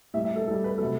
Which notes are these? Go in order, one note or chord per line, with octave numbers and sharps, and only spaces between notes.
A2 G3 E5
E5
A4
A2 G3 A4
B4
C3 F#3 A3 A4